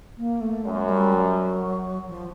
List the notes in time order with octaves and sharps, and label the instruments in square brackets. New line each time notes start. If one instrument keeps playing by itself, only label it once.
[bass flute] A#3
A3
[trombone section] F#2 [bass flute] G#3
[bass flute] G3
F#3
F3